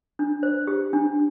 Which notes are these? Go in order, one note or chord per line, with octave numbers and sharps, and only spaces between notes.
D4
C5
G4
D4